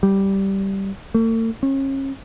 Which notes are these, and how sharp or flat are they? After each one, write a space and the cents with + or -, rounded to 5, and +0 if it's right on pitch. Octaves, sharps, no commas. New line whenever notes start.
G3 -5
A3 +45
C#4 -35